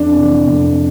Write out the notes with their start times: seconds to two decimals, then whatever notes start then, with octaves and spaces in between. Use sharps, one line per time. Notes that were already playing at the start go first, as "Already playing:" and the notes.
Already playing: F2 D4
0.14 C3 E3
0.47 F2